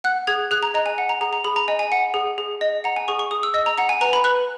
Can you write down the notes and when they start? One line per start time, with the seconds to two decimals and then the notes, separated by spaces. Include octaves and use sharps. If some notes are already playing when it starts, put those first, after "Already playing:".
0.04 F#5 F#6
0.27 G#4 G#6
0.51 G#4 F#6
0.63 A#5
0.74 D#5 A#5
0.86 G#5
0.98 F#5
1.09 A#5
1.21 G#4 A#5
1.33 A#5
1.44 G#4 B5
1.56 A#5
1.68 D#5 G#5
1.79 G#5
1.92 F#5
2.14 G#4
2.38 G#4
2.61 D#5
2.84 F#5 A#5
2.96 G#5
3.08 G#4 C#6
3.19 C#6
3.31 G#4 D#6
3.43 E6
3.54 D#5 E6
3.66 A#5
3.78 F#5 A#5
3.89 G#5
4.01 B4 A#5
4.13 B5
4.24 B4 F#6